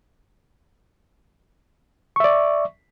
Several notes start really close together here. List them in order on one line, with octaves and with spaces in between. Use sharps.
C#6 E5 D5